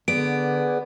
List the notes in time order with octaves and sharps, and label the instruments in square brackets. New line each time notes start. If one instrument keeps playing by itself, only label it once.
[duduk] D3 [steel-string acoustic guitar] B3 [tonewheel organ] G#4 D5 [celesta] D7